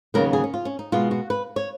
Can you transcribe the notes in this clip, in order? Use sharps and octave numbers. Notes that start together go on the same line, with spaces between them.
D#2 C#3 F#3 B3 A#4
G#4
C#4
F4
C#4
D#4
B2 G#3 B3 F4
F#4
B4
C#5